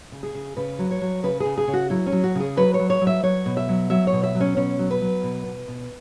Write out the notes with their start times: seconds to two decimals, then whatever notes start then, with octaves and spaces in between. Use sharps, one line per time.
0.12 C#3
0.23 G#4
0.35 C#3
0.57 C#3 B4
0.79 F#3
0.91 C#5
1.01 F#3
1.23 C#3 B4
1.40 G#4
1.45 C#3
1.58 G#4
1.68 C#3
1.73 F#4
1.90 F#3 E4
2.06 C#4
2.12 F#3
2.24 F#4
2.35 C#3
2.40 G#4
2.57 F#3 B4
2.74 C#5
2.79 F#3
2.90 C#5
3.01 F#3
3.07 E5
3.23 F#3 C#5
3.46 B2
3.57 E5
3.69 F#3
3.90 F#3 E5
4.07 C#5
4.13 B2
4.24 E5
4.35 F#3
4.41 C#4
4.57 B2 C#4
4.79 F#3
4.91 B4
5.01 F#3
5.23 B2
5.46 B2
5.68 B2